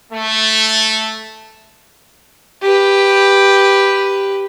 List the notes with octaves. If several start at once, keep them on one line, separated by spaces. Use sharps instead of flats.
A3
G4 B4